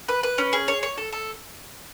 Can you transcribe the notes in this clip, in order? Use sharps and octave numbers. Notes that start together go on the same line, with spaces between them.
B4
B4
C#4
G#4
C#5
C#5
A4
A4